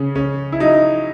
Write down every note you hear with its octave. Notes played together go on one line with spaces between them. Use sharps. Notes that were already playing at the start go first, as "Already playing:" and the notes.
Already playing: C#3 C#4
C#3 C#4
E4
F#3 D#4